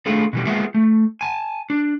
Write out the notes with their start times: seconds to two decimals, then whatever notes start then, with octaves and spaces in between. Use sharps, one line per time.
0.06 A3 D4 E4 F4 G#4 A4
0.33 B2 E3 G3
0.46 G#3 A#3 B3 F4 G#4 E5
0.74 A3
1.21 G#5 A5
1.70 D4